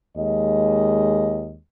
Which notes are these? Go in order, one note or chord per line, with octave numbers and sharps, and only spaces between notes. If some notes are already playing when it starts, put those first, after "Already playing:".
D#2 G#3 D#5